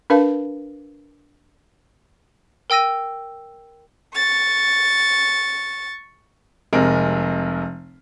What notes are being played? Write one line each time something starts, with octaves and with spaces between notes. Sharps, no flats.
D4 A#4 B4 F5 A5
A#4 G5 E6 A#6 D#7
C#6 A6
F1 C3 G#3 A#4